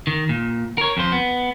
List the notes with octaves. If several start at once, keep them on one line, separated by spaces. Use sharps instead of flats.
D#3
A#2
A#4 C#5
F2 C5
B3